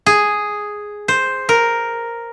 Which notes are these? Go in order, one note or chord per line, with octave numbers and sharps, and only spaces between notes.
G#4
C5
A#4